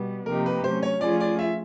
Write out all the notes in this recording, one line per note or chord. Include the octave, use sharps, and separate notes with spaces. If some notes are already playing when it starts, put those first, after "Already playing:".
Already playing: B2 G3 B3
C3 F3 A#3 D#4 G4 A#4
B4
F#3 A3 C#4 C5
C#5
F3 A3 C#4 F4 G#4 D5
D5
E5